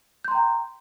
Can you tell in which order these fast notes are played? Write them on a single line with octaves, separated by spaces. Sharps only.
G6 C6 A#5 G5